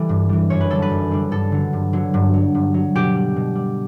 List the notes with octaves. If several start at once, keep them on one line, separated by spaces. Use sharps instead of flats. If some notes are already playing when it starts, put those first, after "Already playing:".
Already playing: E3 G3 A4 B4
G2
E3 G3
F#2 C#5
B4
D3 G3 A4
B4
F#2
D3 G3
G2 A4
D3 F#3
G2
D3 F#3
G2
F#3
G2
F#3
B2 G4
G3
B2
G3